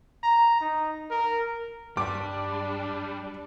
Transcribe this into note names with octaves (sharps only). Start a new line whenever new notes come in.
A#5
D#4
A#4
G2 G3 D4 D6